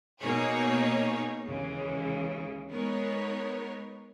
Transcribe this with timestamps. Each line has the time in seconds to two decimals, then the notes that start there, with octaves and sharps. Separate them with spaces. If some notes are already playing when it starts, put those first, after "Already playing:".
0.20 B2 A#3 D#4 G#4 C#5
1.45 D#2 C#3 E3 G#3
2.70 G#3 B3 D#4 A#4 C#5